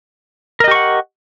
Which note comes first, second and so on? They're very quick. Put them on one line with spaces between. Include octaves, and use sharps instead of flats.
A#4 D#5 G4 C#6 F#5